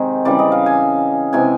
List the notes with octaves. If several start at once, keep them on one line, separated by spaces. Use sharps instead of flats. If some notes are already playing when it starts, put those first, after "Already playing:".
Already playing: C3 D#3 G#3
C#3 E3 G3 D5
D#5
F5
G#5
C3 E3 G#3 G#5